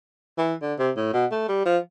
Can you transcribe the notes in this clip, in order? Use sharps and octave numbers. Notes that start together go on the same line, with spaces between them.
E3
D3
C3
A2
B2
A3
G3
F3